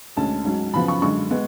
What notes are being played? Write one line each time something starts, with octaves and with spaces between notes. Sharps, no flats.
D2 D3 G#3 C#4 A5
G#2 F#3 C#4
F#2 C#3 F3 B3 B5
C#6
F#2 D3 G#3 C#6
G#3 B3